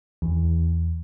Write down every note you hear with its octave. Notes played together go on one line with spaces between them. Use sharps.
E2